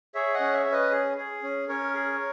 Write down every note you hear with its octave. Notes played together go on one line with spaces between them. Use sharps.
G#4 C#5 E5
D#5 F#5
C#4
C#5 E5
C#4
B4 D#5
G#4
G#4
C#4
C#4 A#4 C#5
G#4